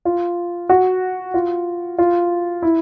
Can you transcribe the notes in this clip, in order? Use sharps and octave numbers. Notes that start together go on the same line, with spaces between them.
F4
F#4
F4
F4
E4